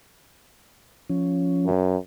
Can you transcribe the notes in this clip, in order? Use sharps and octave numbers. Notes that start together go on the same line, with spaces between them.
F3 C#4
F#2